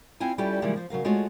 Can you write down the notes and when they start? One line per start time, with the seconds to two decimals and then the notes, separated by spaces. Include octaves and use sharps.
0.20 C4 E4 F4 G#5
0.38 G3 C#4 E4 F4 G4 A4
0.62 C#3 E3 F3 G3 G#3 A#3
0.76 F3 C5
0.90 C#3 F#3 A#4 F5
1.05 G#3 A3 F4 F#4 C#5